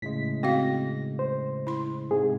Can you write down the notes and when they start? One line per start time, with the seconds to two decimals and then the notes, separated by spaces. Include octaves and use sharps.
0.02 A2 C#3 G#3 B6
0.43 C4 F#4 F5 A#6
1.19 C5
1.67 E4 C6
2.11 G#2 C3 G#4